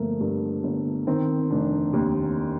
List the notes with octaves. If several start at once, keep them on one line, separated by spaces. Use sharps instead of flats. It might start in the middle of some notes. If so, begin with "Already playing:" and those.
Already playing: G1 F3 A3 A#3
G2
G1
D#3 C4
F1 D4
D#2